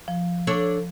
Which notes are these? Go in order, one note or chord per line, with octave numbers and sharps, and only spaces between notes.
F3
D4 A4 C#5